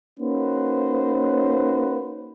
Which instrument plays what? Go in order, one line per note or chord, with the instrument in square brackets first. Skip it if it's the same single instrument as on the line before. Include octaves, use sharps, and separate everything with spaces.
[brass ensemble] A#3 C#4 D#4 F#4 B4 C5